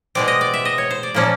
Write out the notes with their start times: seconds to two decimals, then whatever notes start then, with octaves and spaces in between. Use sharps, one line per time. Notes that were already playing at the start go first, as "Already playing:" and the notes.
0.15 B2 G#3 C4 D5
0.28 D#5
0.41 D5
0.54 E5
0.65 D#5
0.78 C#5
0.91 C5
1.03 D5
1.14 A#2 F3 A#3 C#4